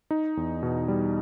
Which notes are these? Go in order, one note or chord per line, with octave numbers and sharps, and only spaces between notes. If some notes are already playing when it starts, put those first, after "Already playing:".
D#4
E2
B2
G3